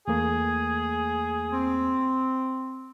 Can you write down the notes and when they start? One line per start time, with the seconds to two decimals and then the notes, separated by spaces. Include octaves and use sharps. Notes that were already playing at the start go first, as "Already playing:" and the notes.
0.08 E2 A3 A#3 G#4
1.53 C4